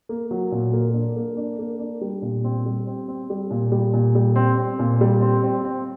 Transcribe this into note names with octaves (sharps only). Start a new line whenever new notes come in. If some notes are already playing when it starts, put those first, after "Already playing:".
A#3
F#3
A#2
A#3
D4
A#3
D4
A#3
D4
G3
A#2
C4
G3
C4
C4
G3
A#2
G3
A#2
G3
C4
C4
A#2
G3
C4
C4
C4